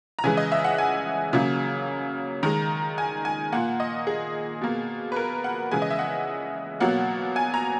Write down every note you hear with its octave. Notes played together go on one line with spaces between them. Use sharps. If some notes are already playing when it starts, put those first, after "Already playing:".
A#5
C#3 E3 G#3 G#5
D#5
E5
F#5
G#5
C#3 F#3 A#3
D#3 G#3 A#5
G#5
G#5
A#2 A#3 F#5
D#5
G#4
B2 A#3
B4
A#4
F#5
C#3 E3 G#3 G#5
D#5
E5
F#5
B2 F#3 A#3 F#5
G#5
A#5